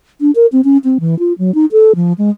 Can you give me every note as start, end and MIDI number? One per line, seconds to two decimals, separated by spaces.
0.21 0.31 62
0.36 0.46 70
0.52 0.61 60
0.64 0.77 61
0.84 0.98 60
1.00 1.18 52
1.19 1.33 65
1.39 1.54 54
1.55 1.66 63
1.72 1.92 69
1.95 2.13 53
2.18 2.30 56